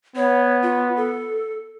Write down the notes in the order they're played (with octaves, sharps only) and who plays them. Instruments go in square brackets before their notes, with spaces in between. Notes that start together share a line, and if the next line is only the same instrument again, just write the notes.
[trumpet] B3 [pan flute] C#5
[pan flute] F4
A4